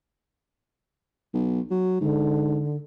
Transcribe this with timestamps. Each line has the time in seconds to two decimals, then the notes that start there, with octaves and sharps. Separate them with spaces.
1.34 B1
1.71 F#3
2.01 G#2 D3